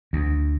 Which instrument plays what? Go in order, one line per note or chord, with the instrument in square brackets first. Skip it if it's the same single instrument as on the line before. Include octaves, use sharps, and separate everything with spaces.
[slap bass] D2